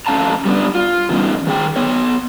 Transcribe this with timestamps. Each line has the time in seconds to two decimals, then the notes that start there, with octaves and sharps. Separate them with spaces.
0.07 F2 A3 C#4 F5 A5 A#5
0.45 G3 B3 D4
0.75 F4
1.09 D3 E3 G3 B3 C#4 D#4
1.47 D#3 G#4 G5
1.76 B3 C#5